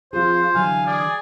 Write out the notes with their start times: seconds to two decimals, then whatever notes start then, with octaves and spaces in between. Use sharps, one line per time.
0.13 F3 C4 F4 G#4 C5
0.55 D3 E3 F#3 F5 G#5
0.86 G#4 D5